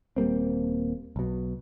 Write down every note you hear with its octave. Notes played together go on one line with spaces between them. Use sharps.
D#1 G3 A#3 C4
B1 B2